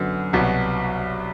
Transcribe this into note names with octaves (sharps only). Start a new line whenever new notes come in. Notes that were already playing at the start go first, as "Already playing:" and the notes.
Already playing: F#2 D3 F#3 B3
C2 B2 F#3